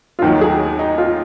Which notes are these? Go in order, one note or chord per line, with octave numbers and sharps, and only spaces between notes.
F4
D#2 D#3 F#3 F#4
G#4
D#4
F4